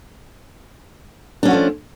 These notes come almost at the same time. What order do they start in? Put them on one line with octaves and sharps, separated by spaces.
D4 C#4 F#3 A3 F3